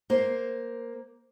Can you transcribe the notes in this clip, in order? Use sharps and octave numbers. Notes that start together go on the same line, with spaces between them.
A#3 C5